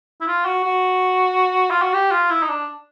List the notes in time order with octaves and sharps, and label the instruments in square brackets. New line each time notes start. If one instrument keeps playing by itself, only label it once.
[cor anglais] E4
F4
F#4
F#4
F4
F#4
G4
F4
E4
D#4
D4